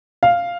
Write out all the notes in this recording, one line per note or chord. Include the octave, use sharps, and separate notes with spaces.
F5